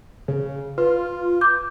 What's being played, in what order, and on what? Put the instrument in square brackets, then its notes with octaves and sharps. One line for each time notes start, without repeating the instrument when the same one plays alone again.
[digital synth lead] C#3
[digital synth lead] F4 [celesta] B4
[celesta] D6 G6